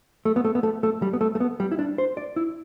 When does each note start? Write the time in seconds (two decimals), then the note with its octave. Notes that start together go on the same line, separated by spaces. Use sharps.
0.25 A3
0.36 B3
0.45 A3
0.55 B3
0.63 A3
0.83 A3
1.02 G3
1.13 B3
1.21 A3
1.35 A3
1.40 B3
1.60 G3
1.72 E4
1.79 D4
1.98 C5
2.17 D5
2.36 E4